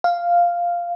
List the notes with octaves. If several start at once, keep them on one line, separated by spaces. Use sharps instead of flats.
F5